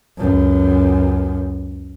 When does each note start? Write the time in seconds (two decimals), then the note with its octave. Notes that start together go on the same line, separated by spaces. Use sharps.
0.18 C#2 F#2